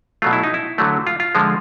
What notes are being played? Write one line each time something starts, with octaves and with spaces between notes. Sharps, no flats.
B2 F#3 A3 F4
E4
D#4
E4
D3 F#3 A3
F4
F4
D3 F3 G#3